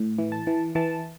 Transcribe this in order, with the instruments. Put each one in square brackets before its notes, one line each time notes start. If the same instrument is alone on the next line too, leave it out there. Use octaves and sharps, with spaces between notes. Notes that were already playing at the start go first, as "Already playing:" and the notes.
Already playing: [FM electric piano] A2
E3
A5
E3
E3 A5